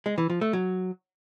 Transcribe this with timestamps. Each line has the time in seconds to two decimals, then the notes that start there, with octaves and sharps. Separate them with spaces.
0.06 G#3
0.18 E3
0.30 F3
0.41 A3
0.53 F#3